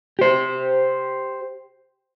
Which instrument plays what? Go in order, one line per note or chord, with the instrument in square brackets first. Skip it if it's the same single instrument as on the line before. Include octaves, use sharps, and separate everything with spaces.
[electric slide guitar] G4 C5